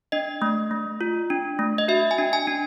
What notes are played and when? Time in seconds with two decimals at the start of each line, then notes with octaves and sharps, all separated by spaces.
0.12 D4 D#5
0.42 A3
0.71 A3
1.01 F4
1.30 D4
1.59 A3
1.78 D#5
1.88 F#4 E5
2.11 G#5
2.18 D4
2.33 G#5
2.47 D4